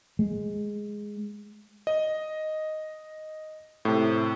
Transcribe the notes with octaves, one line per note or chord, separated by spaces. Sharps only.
G#3
D#5
A2 C3